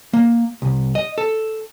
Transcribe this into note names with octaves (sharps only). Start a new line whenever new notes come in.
A#3
C2
D#5
A4